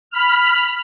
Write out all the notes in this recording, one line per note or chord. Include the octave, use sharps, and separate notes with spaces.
B5 F6